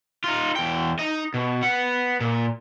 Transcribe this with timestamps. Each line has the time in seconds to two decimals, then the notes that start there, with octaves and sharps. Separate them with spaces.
0.24 D#4 F4
0.56 E2 G5
0.99 D#4 D#5
1.34 B2
1.62 B3 F#5
2.21 A#2